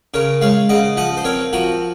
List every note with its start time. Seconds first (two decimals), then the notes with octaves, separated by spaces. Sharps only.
0.14 C#3 A#4 C#5
0.41 G#3 C#5 F5
0.69 C#3 D#5 F#5
0.97 F3 D#5 F#5
1.17 C5
1.25 C4 A#4 C#5
1.53 F3 F#4 A#4